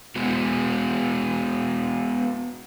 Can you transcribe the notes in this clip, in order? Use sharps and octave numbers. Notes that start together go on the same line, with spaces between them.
G#3 B3 F#4